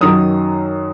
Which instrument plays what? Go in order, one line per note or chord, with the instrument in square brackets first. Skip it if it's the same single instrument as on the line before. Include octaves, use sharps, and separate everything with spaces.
[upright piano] F#2 D#3 F#3 D#6